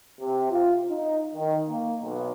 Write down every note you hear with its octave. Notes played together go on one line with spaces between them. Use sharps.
C3
F4
D#4
D#3
A#3
B1